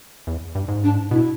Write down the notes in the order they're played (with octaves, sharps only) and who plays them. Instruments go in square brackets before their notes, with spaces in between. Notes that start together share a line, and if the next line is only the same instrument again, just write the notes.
[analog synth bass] E2
G2
G#2
[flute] D4
[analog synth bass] B2 [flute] E4